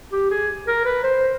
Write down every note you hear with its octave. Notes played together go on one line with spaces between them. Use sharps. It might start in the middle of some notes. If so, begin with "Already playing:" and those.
G4
G#4
A#4
B4
C5